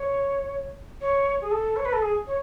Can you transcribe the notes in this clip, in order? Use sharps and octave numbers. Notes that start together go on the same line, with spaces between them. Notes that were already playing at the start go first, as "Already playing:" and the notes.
Already playing: C#5
C#5
G#4
A4
C#5
B4
A4
G#4
C#5